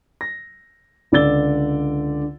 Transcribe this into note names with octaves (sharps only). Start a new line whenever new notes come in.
A#6
C#2 D3 D5 E6 A6 G7